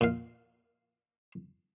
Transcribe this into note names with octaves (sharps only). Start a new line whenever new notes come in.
A#2 F5